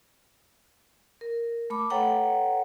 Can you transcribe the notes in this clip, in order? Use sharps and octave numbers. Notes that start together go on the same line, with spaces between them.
A#4
A3 B5 D6
A4 B4 C#5 F#5 G5 A#5